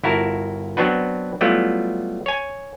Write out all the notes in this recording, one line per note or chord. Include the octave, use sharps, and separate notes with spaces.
G1 E4 F#4 A#4 A5
F#3 B3 C4 D4 F#4 B4
F#3 G3 A3 B3 E4 F4
C#5 G#5